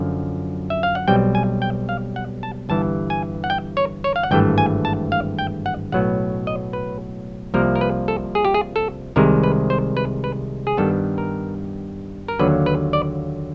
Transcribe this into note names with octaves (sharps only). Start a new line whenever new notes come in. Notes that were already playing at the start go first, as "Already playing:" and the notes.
Already playing: F#2 D3 F3
E5
F5
F#5
B1 B2 G3 C4 G5
G#5
G5
F5
F#5
A5
G1 G2 E3 A5
G#5
F#5
G5
C#5
C#5
F5
F#5
G#1 G2 E3 A3 G5
G#5
A5
F5
G5
F#5
B1 A2 F#3 B3 F#5
D#5
B4
C2 C3 F3 A#3 A#4
A#4
B4
A4
G#4
G4
G#4
A4
C2 C3 D#3 G#3 A#4
B4
C5
B4
B4
G#4
G2 D#3 G3 B3 A4
A#4
A#4
D#2 D3 F#3 A#3 B4
B4
D5